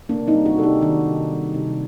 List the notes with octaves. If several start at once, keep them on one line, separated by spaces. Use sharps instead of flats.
C3 A#3 D4
C4 D#4
G3
D4 F#4
C3 A4
D#4 G4
D#3 D4 F#4
C3
G3
C3